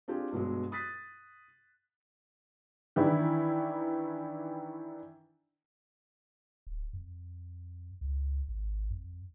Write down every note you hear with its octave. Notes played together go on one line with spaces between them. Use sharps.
C4 D4 F4 G4 G#4
G2 B2 F#3 G#3
D#6 F#6 A6 B6
D#3 E3 D4 E4
D1
F2
C#2
G#1
F2